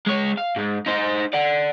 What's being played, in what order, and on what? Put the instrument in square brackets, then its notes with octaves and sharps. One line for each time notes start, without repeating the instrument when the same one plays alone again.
[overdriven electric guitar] G#3 C#5
F5
G#2 G#3
D#4 C5
D5 F#5